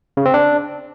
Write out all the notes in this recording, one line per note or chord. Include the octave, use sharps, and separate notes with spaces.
C#3
C4
D4